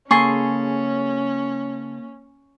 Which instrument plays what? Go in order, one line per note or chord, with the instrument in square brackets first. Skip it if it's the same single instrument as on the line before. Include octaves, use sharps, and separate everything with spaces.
[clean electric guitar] C#3 A4 C6 [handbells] A#3 A6 [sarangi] C#4 [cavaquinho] G#4 C#6